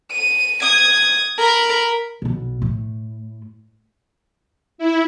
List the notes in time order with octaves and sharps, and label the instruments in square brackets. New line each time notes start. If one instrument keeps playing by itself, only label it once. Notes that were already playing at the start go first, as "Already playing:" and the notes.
[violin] D#7
D#6 G#6
A#4 B5
[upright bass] B1 B2
A2
[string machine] E4